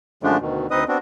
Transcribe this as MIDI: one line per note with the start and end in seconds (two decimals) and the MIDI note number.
0.23 0.37 42
0.23 0.37 50
0.23 0.37 53
0.23 0.37 56
0.23 0.37 57
0.23 0.37 62
0.41 0.67 38
0.41 0.67 47
0.41 0.67 51
0.71 0.84 38
0.71 0.84 60
0.71 0.84 63
0.71 0.84 71
0.71 0.84 75
0.71 0.84 87
0.88 0.98 59
0.88 0.98 60
0.88 0.98 62
0.88 0.98 66